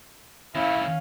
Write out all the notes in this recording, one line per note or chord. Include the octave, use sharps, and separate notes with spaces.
D#3 A3 C#4 E4 F5